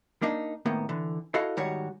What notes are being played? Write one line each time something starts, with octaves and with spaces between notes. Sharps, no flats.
A#3 D4 D#4
A2 D#3 A#3 B3
D3 E3
E4 F#4 A4 D#5 F5
G#2 D#3 G3 F#4 C#5